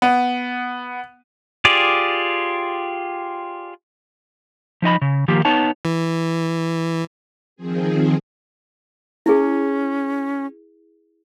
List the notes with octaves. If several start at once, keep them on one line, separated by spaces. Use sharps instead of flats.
B3
F4 G4 G#4 D5
F3 D#4 D#5 B5
C#3
D#3 F3 A#3 G4
B3 D#4 C#5 A5
E3
D#3 F3 C4 G#4
C#4 E4 G#4